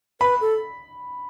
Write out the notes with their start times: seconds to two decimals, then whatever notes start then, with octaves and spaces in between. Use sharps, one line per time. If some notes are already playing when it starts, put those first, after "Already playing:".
0.21 B4 B5
0.41 A4